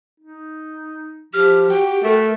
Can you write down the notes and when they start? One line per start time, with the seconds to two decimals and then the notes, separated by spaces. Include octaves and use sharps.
0.20 D#4
1.34 F3 G4 F6
1.69 F#4 G5
2.03 A3 A#4